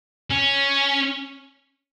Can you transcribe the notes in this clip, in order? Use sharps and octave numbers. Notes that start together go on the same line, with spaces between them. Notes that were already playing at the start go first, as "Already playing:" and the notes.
C#4